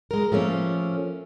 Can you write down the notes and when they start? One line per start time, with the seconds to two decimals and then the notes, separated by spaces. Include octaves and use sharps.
0.11 G#3 A#4
0.32 F3 A3 A#3 C#4